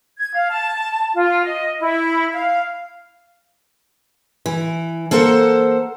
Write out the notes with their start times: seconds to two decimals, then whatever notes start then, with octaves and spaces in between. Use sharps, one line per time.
0.18 G#6
0.34 F5
0.50 A5
1.15 F4
1.45 D#5
1.80 E4
2.32 F5
4.46 E3
5.11 A#3 A4 C5 F#5